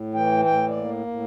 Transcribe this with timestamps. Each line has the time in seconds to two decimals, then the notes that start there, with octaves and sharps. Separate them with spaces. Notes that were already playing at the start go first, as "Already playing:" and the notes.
Already playing: A2
0.14 E3 G5
0.45 A2 G5
0.69 D5
0.76 A#3
1.07 A2